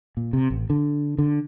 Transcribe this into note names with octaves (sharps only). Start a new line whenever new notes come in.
A#2
C3
A1
D3
D3